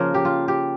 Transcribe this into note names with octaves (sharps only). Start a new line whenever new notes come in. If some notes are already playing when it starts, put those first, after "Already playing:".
Already playing: C#3 F3 A#3 A#4 C5
G4
F4
G4